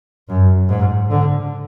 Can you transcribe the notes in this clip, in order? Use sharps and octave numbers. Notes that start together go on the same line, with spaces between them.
F#2
G#2
D3